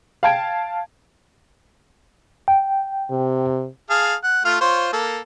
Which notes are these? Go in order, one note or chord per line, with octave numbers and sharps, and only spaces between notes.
F5 G5 A5 G#6 D7
G5
C3
G#4 F5 A5
F#5
A3 F4 F5
F4 C5 C#5
A#3 A4